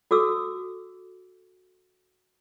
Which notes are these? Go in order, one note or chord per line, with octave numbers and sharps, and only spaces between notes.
F#4 A4 D6 E6